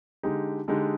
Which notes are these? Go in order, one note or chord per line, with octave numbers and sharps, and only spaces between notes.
D3 G#3 D#4 G4
D3 G#3 D#4 G4